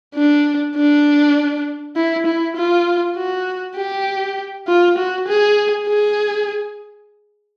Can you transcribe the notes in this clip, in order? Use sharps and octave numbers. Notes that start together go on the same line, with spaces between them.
D4
D4
E4
E4
F4
F#4
G4
F4
F#4
G#4
G#4